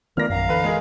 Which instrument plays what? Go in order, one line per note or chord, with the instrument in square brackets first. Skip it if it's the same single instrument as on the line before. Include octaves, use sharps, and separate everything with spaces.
[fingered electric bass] D#3 A3 B3 [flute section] F4 A#4 D5 [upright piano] F6 A#6
[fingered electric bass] A#1 F#2 [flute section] F5 A#5
[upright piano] D3 B4 [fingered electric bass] E3
[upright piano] G#3 G#4 A#4